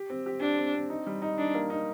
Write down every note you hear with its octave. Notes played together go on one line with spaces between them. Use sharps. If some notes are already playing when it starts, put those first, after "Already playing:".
Already playing: G4
C4
G4
D4 G4
C4
C4
D#4
G3
D#4
D4 D#4
A#3
D#4